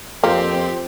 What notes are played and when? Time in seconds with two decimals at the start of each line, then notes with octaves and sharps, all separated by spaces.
0.24 F2 A#3 C4 G4